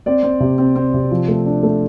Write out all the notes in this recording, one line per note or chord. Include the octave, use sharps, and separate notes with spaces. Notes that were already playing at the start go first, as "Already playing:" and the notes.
C4 D5
C4
C3
C4
C4
C3
F3
A3
D4
A3